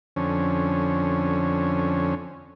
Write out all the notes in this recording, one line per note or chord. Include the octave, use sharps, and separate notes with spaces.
F2 D3 C#4